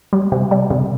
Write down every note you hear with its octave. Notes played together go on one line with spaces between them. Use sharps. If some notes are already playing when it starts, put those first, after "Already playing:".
G3
C3
G3
C3